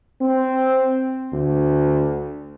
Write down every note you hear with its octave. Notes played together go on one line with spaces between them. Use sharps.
C4
D2